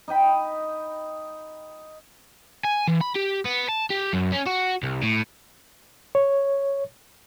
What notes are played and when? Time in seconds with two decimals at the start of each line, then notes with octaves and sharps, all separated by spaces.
0.08 D#4 D#5 G5 B5
2.65 G#5
2.88 E3
3.01 B5
3.15 G4
3.45 B3
3.69 A5
3.90 G4
4.13 F#2
4.32 C#4
4.47 F#4
4.83 C2
5.03 A2
6.15 C#5